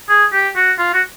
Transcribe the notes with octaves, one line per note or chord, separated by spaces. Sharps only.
G#4
G4
F#4
F4
F#4